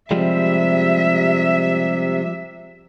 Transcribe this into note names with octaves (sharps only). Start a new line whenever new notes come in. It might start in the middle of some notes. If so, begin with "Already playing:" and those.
C3 F3 G3 G#3 E5